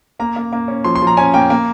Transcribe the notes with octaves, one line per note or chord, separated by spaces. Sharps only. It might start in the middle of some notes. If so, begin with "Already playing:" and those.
A#3 A#5
A#3
A#3
C#4
F3 C6
C6
F3
A#5
C#4 G#5
A#3 G5
A#3